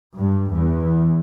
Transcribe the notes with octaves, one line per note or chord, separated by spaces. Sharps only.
G2
E2